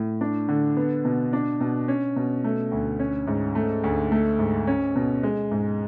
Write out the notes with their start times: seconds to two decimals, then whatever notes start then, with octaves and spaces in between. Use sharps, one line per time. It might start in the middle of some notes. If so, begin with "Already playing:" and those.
Already playing: A2
0.21 D4
0.49 D3
0.77 B3
1.05 B2
1.33 D4
1.60 B2
1.88 C#4
2.16 B2
2.44 A3
2.71 D2
2.99 C#4
3.27 G#2
3.55 A3
3.84 D2
4.12 A3
4.39 G#2
4.67 C#4
4.95 B2
5.23 G#3
5.51 G#2